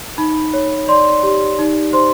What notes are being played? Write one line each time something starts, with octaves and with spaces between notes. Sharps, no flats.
D#4 B5
C#5
D5 C6
G4
D#4
C5 C6